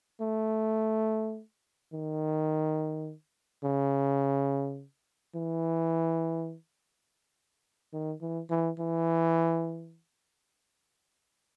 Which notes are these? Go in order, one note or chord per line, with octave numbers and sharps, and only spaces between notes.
A3
D#3
C#3
E3
D#3
E3
E3
E3